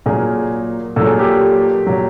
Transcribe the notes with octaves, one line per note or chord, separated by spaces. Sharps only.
A#2 F#3 G#4 A#4
A#2 F#3 A4
G#4
G4 A4
A#2 F#3